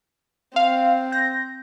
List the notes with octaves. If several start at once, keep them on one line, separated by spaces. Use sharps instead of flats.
C4 F5
G6 A#6